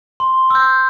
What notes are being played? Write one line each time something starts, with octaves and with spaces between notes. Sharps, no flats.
C6
E6 G6